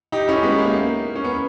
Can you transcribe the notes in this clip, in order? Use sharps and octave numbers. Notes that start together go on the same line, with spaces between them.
D#4 G4
C#4 E4
G#3 B3
A#3
A#3
C#4
B3